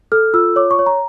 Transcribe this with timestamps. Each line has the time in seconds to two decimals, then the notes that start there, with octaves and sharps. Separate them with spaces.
0.12 A4 F6
0.34 F4 E6
0.56 C#5 D6
0.71 C#6
0.79 C#5
0.86 A#5